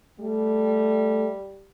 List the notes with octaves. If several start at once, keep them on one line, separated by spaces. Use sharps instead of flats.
G3 A3